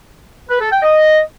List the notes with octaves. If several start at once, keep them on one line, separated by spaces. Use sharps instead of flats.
B4
A4
G5
D#5